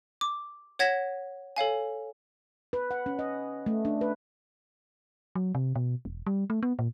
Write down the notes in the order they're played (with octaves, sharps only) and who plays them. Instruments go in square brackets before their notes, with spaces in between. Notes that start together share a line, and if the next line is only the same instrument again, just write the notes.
[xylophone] D6
C#5 F#5 G#6 A#6 B6 E7
A4 C#5 F5 G#5
[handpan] B4
F#5
C#4
D#5
A3
D4
B4
[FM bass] F#3
C3
B2
E1
G3
A3
B3
A#2